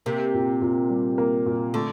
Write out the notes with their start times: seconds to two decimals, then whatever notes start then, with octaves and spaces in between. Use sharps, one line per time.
0.06 C3 A#3
0.34 A#2
0.62 A#2
0.90 G3
1.18 A#3
1.46 A#2
1.74 D3 A3